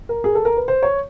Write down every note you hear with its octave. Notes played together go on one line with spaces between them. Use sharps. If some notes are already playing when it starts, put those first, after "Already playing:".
A#4
G#4
A4
A#4
B4
C5
C#5